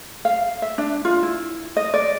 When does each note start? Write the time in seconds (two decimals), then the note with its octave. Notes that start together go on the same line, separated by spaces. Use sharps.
0.25 F5
0.62 E5
0.78 D4
1.05 F4
1.23 E4
1.77 D#5
1.94 D5